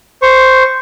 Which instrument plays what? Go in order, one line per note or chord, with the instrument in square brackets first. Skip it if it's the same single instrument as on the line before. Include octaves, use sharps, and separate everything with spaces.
[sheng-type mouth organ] C5 C#6